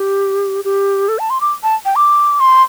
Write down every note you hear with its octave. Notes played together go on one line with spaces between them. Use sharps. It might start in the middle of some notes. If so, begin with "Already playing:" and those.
Already playing: G4
G4
A4
A5
C6
D6
A5
G5
D6
C6